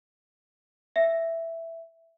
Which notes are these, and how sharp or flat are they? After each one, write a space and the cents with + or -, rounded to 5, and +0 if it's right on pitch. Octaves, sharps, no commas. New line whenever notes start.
E5 +5